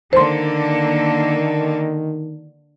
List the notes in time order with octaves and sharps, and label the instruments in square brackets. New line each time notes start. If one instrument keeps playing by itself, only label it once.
[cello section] D3 A#3 A4 [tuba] D#3 [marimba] C5 C6